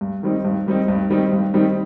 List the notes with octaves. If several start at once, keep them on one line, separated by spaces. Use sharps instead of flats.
G2
D#3 G3 C4 D#4
G2
D#3 G3 C4 D#4
G2
D#3 G3 C4 D#4
G2
D#3 G3 C4 D#4